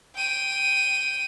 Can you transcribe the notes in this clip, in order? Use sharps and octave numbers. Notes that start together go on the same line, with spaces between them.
G5 D#7